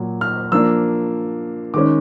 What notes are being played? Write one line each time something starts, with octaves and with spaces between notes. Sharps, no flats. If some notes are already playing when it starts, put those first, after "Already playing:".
Already playing: A#2 F#3
F6
F3 A#3 D4 E6
D#3 G#3 C#4 D6